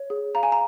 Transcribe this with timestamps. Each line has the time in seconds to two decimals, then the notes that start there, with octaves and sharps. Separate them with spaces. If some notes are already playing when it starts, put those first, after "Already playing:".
Already playing: C#5
0.10 G#4
0.35 F5 A#5
0.43 G#5
0.52 A#5